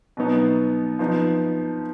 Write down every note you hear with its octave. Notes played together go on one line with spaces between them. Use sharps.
B2 F#3 B3 D#4
F3 B3 D#4